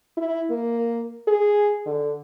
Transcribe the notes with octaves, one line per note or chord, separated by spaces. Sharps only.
E4
A#3
G#4
D3